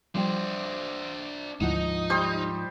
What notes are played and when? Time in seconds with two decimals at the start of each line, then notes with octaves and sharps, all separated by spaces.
0.15 F3 G3 D4 C5 G5
1.61 D2 G#2 F3 D#4 E4 F#5
2.10 G3 C5 D#6